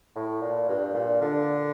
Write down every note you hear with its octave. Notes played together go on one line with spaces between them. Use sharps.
A2
A#2
G2
A#2
D3